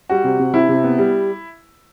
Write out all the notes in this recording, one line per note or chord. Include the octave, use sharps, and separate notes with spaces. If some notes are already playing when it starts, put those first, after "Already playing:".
G3 F#4
C3
C3
C3 E4
C3
B3
G3